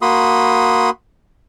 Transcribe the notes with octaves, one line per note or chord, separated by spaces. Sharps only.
A#3 F#4 B5 C6 D#6